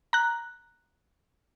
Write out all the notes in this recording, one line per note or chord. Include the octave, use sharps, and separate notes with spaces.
A#5 F#6